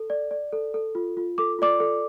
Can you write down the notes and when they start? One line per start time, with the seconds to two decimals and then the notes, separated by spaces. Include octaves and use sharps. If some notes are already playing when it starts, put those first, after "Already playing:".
Already playing: A4
0.10 D5
0.31 D5
0.53 A4
0.74 A4
0.95 F4
1.17 F4
1.38 A4 D6
1.59 F4 D5 D6
1.80 A4